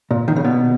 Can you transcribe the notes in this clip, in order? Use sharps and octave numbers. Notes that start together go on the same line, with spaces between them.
A#2
D#3
C#3
B2